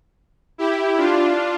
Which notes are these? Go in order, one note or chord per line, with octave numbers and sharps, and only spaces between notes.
E4 G4
D4 F4